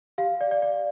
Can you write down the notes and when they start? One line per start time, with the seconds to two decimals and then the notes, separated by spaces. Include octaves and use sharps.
0.18 G4 F5
0.41 D5
0.51 D5
0.62 D5